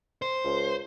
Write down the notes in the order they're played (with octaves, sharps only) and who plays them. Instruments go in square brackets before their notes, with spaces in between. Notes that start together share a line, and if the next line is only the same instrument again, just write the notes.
[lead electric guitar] C5
[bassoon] C#2